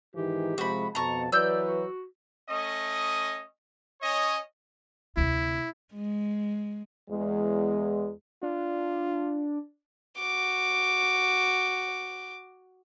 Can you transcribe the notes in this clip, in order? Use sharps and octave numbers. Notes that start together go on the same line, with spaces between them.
G#2 D#3 E3 G4
C3 F3 G#3 F#4 B5
F2 B2 A5 A#5 C#6
E3 F#3 B4 D5 E6 G6
F#4
A3 C#4 D#5
C#4 C#5 D#5
D2 C3 E4
G#3
E2 G#3
D4 F4
F#4 D6